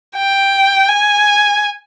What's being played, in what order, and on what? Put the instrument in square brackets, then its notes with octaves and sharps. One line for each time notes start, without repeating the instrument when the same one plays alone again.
[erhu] G5
G#5